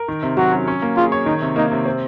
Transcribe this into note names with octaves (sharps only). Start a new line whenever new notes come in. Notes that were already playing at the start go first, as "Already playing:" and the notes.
Already playing: A#4
D#3
C3
F#3 F#4
C#4
C#4
A#3
F4 G#4
C#5
D#3 D#4
C3
A#3 D#4
C3
C4